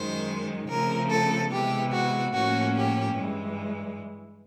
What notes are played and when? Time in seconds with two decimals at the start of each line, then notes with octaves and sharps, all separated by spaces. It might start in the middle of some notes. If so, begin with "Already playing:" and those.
Already playing: F#2 D#3 G#3 C5
0.68 C#3 F3 A3 C4 A#4
1.10 A4
1.50 C3 E3 G#3 B3 G4
1.92 F#4
2.33 A2 F3 A#3 C#4 F#4
2.75 G4
3.16 G2 E3 G#3